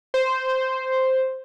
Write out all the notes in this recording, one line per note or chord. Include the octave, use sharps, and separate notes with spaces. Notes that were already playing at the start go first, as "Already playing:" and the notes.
C5